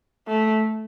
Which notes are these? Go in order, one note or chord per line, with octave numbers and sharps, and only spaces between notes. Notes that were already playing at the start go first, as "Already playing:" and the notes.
A3